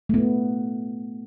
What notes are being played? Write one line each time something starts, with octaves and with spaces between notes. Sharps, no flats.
A3
B3